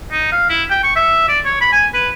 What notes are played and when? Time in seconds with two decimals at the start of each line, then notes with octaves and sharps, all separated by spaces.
0.11 D#4
0.32 F5
0.49 E4
0.70 G5
0.83 C#6
0.96 E5
1.29 D5
1.45 C#5
1.61 B5
1.72 G#5
1.94 B4